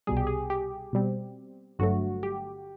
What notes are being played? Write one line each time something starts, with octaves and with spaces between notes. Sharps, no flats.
C2 B2 G3 G#4
G4
G#4
G4
B2 G3 C4
G1 G2 D3 F#3 A3 F#4
G4